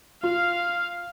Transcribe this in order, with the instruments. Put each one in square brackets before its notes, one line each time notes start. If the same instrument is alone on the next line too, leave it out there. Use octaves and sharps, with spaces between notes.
[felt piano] F4 [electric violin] F5 F6